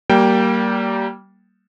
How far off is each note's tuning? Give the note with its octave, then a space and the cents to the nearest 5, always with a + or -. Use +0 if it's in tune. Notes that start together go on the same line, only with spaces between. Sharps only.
G3 -20 A#3 +0 G5 +0